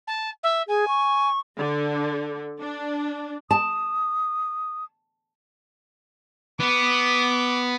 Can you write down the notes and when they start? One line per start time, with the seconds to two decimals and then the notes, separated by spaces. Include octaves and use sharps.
0.07 A5
0.43 E5
0.68 G#4 G#5
0.88 C#6
1.58 D3
2.60 D4
3.51 A5 D#6
6.60 B3 D6